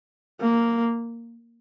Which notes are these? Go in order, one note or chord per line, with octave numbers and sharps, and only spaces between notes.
A#3